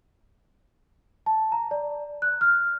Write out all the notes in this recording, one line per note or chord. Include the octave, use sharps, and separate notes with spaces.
A5
A#5
D5
F#6
F6